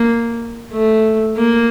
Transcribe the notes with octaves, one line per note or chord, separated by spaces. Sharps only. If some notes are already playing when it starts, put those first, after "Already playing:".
Already playing: A#3
A3
A#3